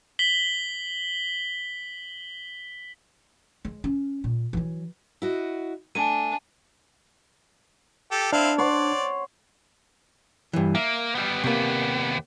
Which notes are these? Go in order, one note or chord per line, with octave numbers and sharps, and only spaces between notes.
B6 F#7 G7
G#3
C#4
A#2
E3 F#3
E4 F#4 D#5
A3 D4 G#5 D#7
G4 A4
C4 D4 E4 F5
C#5 D5 F#5 C6
G2 E3
A#3 E5
G3 B3
D#2 C3 A#3 B3